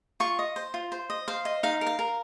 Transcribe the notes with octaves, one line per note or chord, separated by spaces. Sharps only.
F4 C#6
D#5
C5
F4
C5
D#5
C5 F5
D#5
D#4 F5
A#4
F5
A#4